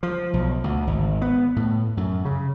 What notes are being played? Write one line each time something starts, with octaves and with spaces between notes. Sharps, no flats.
F3
B1
D2
G#1
B3
A2
F#2
C#3